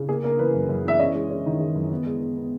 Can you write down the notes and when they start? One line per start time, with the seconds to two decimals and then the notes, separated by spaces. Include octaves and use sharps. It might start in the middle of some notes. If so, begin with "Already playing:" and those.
Already playing: C#3
0.09 A#3 G#4
0.23 A#3 A#4
0.39 E3 B4
0.54 F#2
0.69 F#2
0.85 E3 E5
0.99 C#4 D#5
1.15 G#3
1.30 C#4
1.46 D#3
1.60 G#3
1.75 F#2
1.91 B3
2.06 G#3
2.21 B3
2.36 B3